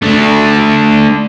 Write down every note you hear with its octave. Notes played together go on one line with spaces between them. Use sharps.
A3 D4